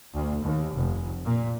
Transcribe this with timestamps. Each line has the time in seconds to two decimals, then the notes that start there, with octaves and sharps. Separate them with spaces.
0.14 D2
0.44 D#2
0.76 F1
1.25 A#2